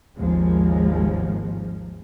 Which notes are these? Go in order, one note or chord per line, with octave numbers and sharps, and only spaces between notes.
G#1 D#2 F3 G#3